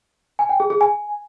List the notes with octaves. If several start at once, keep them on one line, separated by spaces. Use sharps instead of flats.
G#5
G5
G#4
G#4
G#5